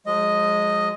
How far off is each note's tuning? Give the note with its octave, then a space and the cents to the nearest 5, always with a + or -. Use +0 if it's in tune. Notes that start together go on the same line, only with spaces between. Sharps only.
F3 +45 G#3 +0 D#5 +0